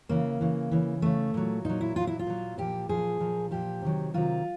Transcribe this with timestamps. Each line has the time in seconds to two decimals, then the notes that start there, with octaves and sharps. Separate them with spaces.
0.09 C#3 E3 A#3
0.41 C#3 E3
0.71 C#3 E3
1.02 C#3 E3 A3
1.34 A#2 F#3
1.65 A#2 F#3 D#4
1.81 E4
1.96 A#2 F#3 F4
2.07 E4
2.19 F4
2.27 A#2 F#3
2.58 A#2 F3 G4
2.89 A#2 F3 G#4
3.20 A#2 F3
3.51 A#2 F3 G4
3.82 C3 D#3 F#3
4.14 C3 D#3 F#3 F4